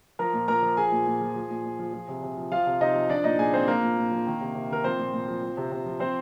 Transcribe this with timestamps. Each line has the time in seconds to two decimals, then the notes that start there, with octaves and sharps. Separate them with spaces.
0.19 F3 A#4 A#5
0.33 A#2
0.48 A#2 A#4 A#5
0.62 F3
0.77 F3 G#4 G#5
0.92 A#2
1.06 A#2
1.21 F3
1.36 F3
1.50 A#2
1.65 A#2
1.79 F3
1.93 F3
2.08 C3
2.22 C3
2.37 F3
2.52 F3 F4 F5
2.66 C3
2.81 C3 D#4 D#5
2.95 F3
3.09 F3 D4 D5
3.24 A#2 D#4 D#5
3.39 A#2 G#4 G#5
3.53 F3 C4 C5
3.68 F3 A#3 A#4
3.82 A#2
3.97 A#2
4.11 F3
4.26 D#3
4.41 C3
4.55 C3
4.69 D#3 A#4
4.84 F3 C4 C5
4.98 A#2
5.13 A#2
5.28 F3
5.42 F3
5.57 C3
5.72 C3
5.86 F3
6.00 F3 C4 C5